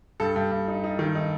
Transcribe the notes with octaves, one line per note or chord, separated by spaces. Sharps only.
G2 A4
G2
G2
D#4
D#4
D#3
D#4